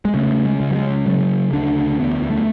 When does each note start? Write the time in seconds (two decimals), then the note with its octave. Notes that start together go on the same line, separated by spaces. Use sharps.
0.05 G#3
0.14 C#3 A3
0.45 G#3
0.60 C#3
0.71 F#3
0.76 G#3
1.06 C#3 F#3
1.53 D2 D4
1.99 E2 B3
2.30 A3